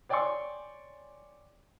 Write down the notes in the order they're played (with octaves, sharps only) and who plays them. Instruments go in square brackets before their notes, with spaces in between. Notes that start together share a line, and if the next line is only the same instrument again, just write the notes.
[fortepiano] C#5 D5 G5 G#5 C6 C#6